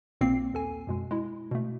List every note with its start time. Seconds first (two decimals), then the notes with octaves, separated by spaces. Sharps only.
0.21 A#1 A#2 A#3 C4 C7
0.54 D#2 A4 G#5
0.87 F#2 B2 G#3
1.11 G#3 E4
1.51 B2 A3